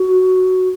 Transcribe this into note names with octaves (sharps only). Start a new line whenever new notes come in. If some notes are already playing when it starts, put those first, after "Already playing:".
Already playing: F#4